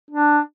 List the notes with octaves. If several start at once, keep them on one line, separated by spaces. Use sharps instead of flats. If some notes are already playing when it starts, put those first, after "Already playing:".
D4